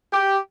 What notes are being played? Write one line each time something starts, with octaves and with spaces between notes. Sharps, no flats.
G4